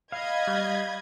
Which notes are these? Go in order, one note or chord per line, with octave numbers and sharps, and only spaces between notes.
D#5 F5 B5 G#6
G3